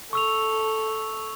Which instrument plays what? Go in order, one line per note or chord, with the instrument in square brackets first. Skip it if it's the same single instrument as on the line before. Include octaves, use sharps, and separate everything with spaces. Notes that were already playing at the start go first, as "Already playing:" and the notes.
[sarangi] A4 [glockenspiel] C#6 E6 F7